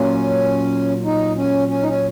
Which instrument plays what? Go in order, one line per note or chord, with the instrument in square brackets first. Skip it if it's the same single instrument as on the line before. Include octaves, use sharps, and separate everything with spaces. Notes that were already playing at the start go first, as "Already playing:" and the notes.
Already playing: [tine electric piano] A#2 F#3 A#3 F4 [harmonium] C#4
[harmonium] D#4
C#4
C#4
D#4
C#4